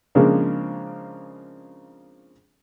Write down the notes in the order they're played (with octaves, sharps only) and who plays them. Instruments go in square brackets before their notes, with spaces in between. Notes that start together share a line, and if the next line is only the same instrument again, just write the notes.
[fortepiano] C#3 F3 G#3 A#3 C4 D4